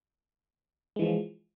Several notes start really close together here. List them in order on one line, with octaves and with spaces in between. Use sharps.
G#3 E3 F3